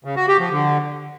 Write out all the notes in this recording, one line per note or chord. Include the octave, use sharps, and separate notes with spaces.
C#3
F#4
G4
F3
D3